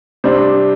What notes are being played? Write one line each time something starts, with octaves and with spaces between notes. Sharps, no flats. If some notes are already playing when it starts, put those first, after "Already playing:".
C3 G3 D4 C5